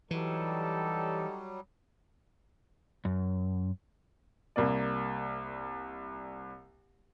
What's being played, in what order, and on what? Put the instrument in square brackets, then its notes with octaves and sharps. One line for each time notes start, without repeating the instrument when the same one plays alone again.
[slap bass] E3 [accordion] F#3 G3 [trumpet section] D#4 G4 A4
[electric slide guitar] F#2
[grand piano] C2 A#3 D5